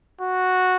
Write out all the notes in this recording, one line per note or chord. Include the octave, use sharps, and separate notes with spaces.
F#4